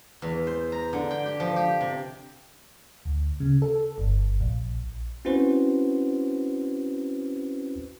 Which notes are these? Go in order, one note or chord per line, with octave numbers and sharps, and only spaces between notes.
E2
C5
A#5
D3
G5
G4
F3
G4
C3
D2
C#3
A4
G1
A#1
C4 C#4 E4 F#4 B4 C5